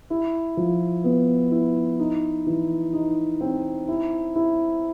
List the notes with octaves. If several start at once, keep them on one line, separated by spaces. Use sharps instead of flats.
E4
F3
B3
E4
D#4
E3
D#4
C4
E4
E4